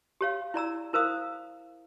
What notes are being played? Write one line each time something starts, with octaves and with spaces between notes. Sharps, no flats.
G4 C#5 F5
E4 D5 A#5 E6
E4 A#4 C5 F5 D#6